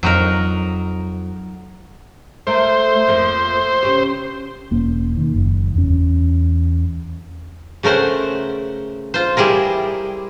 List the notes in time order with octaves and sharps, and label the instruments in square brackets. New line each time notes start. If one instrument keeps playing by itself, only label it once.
[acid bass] F2 [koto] F#3 D#4 A#4
[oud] A3 E4 A#4 [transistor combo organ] C5
[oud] F2 F3 A#3
C#3 G4 C#5
[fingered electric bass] E1 A#3 C#4
D#3
F#1
E2 C#4
[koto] C#3 A3 A#4 C5 F#5
F4 C5
G3 E4 G#4 A#4